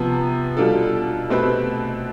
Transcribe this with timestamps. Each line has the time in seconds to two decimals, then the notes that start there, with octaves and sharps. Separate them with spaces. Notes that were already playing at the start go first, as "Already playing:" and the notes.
Already playing: C3 F3 B3
0.57 B2 G3 D4 F4 A4
1.30 B2 A3 C4 G4 B4